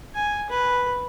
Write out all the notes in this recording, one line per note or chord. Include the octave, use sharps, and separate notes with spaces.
G#5
B4